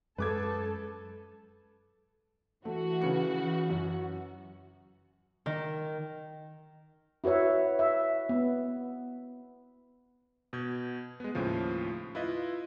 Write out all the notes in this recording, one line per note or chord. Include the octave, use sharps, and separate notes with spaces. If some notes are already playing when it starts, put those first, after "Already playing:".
F#2 G#3 A4 B4 A5 D6 G#6
E3 A3 F#4
C#3 B4 C#7
F#2
D#3
E4 F#4 B4 C#5 E5
E5
B3
B2 G6 G#6
G#3 B3
D#2 A2 C#3 F3
E4 F4 B4 D#5